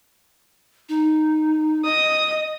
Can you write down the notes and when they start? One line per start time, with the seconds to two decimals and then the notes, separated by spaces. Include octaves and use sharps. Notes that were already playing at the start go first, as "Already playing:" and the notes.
0.89 D#4
1.85 D#5 D#6